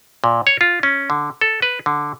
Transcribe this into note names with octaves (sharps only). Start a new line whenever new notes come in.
A#2
C#5
F4
C#4
D3
A4
B4
D3